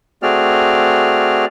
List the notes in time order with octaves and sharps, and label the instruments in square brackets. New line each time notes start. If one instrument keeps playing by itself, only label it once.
[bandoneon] A3 C4 F#4 G#4 D5 F6